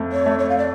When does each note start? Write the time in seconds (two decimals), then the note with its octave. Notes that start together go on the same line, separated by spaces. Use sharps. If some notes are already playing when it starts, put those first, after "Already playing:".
Already playing: F2 A3
0.12 C#5
0.26 A3
0.39 C#5
0.49 F5
0.58 D5